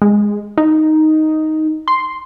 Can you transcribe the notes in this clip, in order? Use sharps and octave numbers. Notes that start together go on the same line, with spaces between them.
G#3
D#4
C6